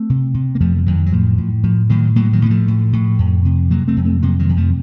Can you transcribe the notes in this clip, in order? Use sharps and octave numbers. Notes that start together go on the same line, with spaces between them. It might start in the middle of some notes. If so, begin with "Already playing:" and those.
Already playing: A3 C4
C3
C3
A#3
F2 F3 A3
F3
F2 D#3 F#3
F#3
A2 F3
A2
A2 F3
A2 D#3 F#3
A2 F#3 A#3
D#3 F#3
A2 A#3
F3 A3
A2
A2
F2
C3
C3 F#3 A#3
A3 C4
F2
A3 C4
C3 F#3 A#3
D#3 F#3
F2
F3 A3